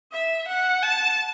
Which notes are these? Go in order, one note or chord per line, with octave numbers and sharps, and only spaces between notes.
E5
F#5
A5